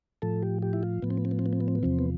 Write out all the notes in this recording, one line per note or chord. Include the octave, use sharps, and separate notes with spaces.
A2 F3 A4
G4
G4
E4
F4
A2 F3 B3
C4
B3
C4
B3
C4
B3
C4
B3
C4
B3
E2 C3 F3 C4
B3